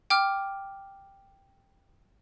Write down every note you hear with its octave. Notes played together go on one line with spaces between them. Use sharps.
G5 D6 F6